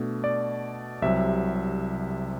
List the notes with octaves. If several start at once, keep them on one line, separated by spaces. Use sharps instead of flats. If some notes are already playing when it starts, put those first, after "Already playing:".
Already playing: B2 A3 D4
D5
C2 C3 F#3 E5